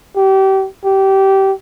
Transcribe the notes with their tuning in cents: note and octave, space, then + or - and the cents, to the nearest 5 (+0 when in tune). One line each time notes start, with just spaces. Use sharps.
G4 -30
G4 -20